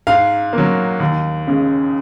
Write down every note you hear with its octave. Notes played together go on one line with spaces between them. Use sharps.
G#2 F5
A#3
F#3
D#2
C#3 G#3